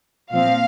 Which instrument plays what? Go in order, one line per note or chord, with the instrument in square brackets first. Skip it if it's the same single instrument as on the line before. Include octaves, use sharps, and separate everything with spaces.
[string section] A#2 F3 C4 F5